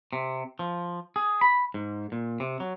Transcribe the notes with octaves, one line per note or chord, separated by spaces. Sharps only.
C3
F3
G#4
B5
G#2
A#2
C3
F#3